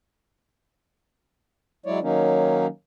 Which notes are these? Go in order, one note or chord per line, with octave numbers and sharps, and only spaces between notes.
F#3 G#3 E4 C#5 D5
D#3 F#3 A#3 C#4 D#4